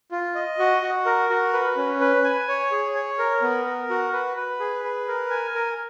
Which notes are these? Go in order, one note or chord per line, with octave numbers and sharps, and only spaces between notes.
F4
D#5
F#4
F#4
A#4
F#4
B4
C#4
B4
G#5
C#5
G#4
C#5
A#4
B3
A#4
F#4
B4
B4
G#4
B4
A#4
G#5
A#4